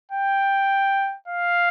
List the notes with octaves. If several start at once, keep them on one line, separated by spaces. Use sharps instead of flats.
G5
F5